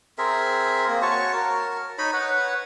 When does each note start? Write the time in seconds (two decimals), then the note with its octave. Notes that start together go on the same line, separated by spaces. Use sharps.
0.18 C4 G#4 A#4 E5
0.88 A#3 C4
1.02 F#4 C#5 A5 C#6
1.33 A#4
1.98 D#4 C#5 D#5 B5
2.13 B4 C#5 F#5